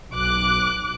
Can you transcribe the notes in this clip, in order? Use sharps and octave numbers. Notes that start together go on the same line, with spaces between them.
B1 D6 F#6